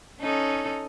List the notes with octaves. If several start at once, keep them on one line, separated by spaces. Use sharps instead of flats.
C#4 D#4 A4